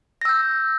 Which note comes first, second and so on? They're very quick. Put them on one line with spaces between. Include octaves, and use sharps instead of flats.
A#6 E6 G6